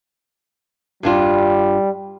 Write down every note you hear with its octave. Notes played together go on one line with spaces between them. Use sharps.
G2 G3 D4 F4